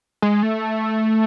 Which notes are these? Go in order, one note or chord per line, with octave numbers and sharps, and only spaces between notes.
G#3
A3